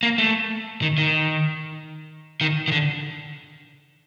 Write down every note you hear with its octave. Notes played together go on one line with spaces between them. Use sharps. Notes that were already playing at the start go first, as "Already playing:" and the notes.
A#3
A3
D#3
D#3
D#3
D#3
D3